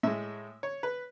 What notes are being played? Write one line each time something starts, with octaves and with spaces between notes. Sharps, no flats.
A2 G#3 E5
C#5
B4